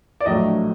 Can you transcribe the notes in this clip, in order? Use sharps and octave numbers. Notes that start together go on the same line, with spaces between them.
D5
A#1 A2 F#3 A3 D4 D#5